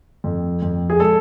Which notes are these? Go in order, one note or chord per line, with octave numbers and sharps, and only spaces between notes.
F2
F2
G#4
G#3 A4